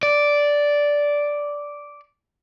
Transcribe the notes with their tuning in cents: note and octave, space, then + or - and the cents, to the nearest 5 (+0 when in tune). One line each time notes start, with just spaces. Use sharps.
D5 -5